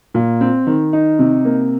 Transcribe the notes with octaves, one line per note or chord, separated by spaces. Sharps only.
A#2
C4
D#3
D#4
C3
A#3